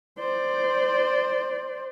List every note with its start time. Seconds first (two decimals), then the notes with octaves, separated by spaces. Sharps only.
0.19 C5 D5